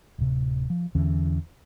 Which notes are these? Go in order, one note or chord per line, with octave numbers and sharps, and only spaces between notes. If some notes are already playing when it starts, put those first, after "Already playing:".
D1 C3
F3
E2 D3 E3 C#4